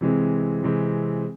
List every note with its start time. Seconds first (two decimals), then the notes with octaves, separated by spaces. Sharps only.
0.01 C3 E3 G#3 C4
0.63 C3 E3 G#3 C4